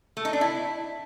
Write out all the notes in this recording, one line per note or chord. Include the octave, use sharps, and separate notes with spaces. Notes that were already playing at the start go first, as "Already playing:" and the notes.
A3
D#4
D4
E4